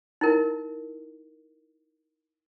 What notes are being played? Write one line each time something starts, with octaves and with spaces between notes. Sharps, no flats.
D#4 E4 A#4